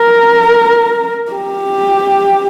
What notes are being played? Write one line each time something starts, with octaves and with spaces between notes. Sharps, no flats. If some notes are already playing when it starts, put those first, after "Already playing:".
Already playing: A#4
G4